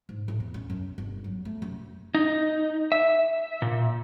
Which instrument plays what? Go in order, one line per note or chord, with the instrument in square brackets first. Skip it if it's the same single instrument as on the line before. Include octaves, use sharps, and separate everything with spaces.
[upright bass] G#2
A2
E2
C#4
F#2
G1
F#3
A3
F#2
[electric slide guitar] D#4
E5
A#2